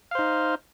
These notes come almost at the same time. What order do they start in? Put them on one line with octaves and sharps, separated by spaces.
F5 C5 D#4